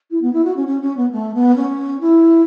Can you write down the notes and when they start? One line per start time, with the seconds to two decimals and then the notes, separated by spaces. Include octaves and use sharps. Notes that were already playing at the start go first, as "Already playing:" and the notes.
0.10 E4
0.21 B3
0.33 E4
0.44 F#4
0.56 C#4
0.66 C#4
0.81 C#4
0.96 B3
1.11 A3
1.34 B3
1.56 C#4
2.00 E4